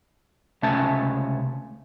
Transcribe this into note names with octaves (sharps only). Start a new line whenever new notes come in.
C#2 C3 A3 C#4 E5 A5